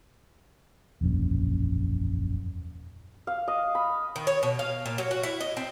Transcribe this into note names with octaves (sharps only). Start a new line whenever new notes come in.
E1 A#1 F#2
F5
D#5
B5
D#3
C#5
B2
F5
A#2
F#3
F#4
E4
D#5
C4